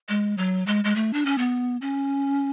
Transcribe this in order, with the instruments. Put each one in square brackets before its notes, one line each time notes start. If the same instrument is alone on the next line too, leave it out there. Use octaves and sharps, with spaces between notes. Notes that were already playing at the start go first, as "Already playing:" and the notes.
[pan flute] G#3
F#3
G#3
G#3
A3
D4
C#4
B3
C#4